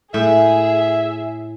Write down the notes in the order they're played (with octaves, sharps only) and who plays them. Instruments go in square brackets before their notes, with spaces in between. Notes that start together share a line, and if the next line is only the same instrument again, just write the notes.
[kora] A2 [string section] G#4 [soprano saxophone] E5